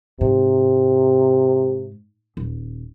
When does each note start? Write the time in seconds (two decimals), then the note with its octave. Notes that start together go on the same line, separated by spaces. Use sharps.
0.21 G#2 C3
2.37 D#1